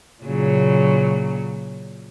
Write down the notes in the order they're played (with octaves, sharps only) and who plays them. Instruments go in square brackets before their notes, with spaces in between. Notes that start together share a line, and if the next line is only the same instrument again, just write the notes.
[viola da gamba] A#2 C#3 F#3